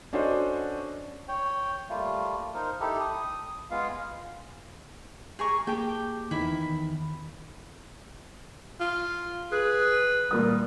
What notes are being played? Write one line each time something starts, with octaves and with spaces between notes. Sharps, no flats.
C#4 D4 F#4 A4 C5 D#5
C#5 G5
G3 A3 A#3 F4
D#4 A#4 C5
D#4 E4 G4 A4
D#6
G#3 B3 F4 F5
G#4 A#4 C#6
A#3 G4 G#4 G5 A5
E2 G2 D#3 E4 B5
F4
G#4 B4
A#2 G3 A#4 D#6